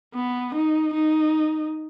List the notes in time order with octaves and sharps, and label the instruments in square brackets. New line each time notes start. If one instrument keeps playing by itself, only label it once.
[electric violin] B3
D#4
D#4